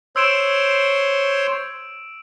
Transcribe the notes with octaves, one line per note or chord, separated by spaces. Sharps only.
C5 C#5 C6 E6 D7 E7